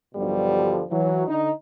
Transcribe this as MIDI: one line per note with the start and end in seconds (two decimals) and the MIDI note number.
0.15 0.83 35
0.15 0.83 43
0.15 0.83 47
0.15 0.83 50
0.15 0.83 53
0.15 0.83 55
0.90 1.26 52
0.90 1.26 54
1.27 1.51 50
1.27 1.51 63